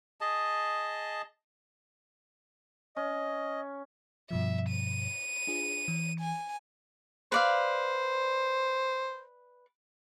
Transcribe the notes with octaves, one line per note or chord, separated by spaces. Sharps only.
G#4 D#5 A5
C#4 D#5
G2 B2 F3 E5
D#7
D4 F4 G#4
E3
G#5
B4 C5 D5 F5